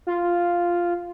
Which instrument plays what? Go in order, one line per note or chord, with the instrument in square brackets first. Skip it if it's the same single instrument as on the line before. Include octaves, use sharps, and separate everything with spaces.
[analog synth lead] F4